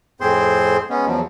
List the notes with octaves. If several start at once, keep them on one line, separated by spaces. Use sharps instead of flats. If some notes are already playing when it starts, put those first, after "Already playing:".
F2 A2 C4 G#4 C5 C6
G#3 B3 C#4
E2 F3 F#3